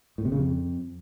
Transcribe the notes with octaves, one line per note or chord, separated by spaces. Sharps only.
A2
C3
C#3
F2